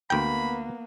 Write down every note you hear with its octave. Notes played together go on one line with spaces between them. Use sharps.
D2 A#3 B3 G5 B5